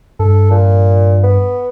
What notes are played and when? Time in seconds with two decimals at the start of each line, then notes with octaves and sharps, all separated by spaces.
0.19 G2 A4
0.50 A#2
1.23 B3